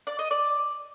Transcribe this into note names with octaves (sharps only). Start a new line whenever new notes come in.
D5
D#5
D5